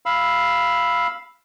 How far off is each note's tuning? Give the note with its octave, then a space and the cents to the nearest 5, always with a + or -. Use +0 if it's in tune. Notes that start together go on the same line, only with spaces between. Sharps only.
F5 +0 B5 +0 E6 +0